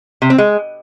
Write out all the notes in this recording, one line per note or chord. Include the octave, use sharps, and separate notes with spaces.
C3
C4
G#3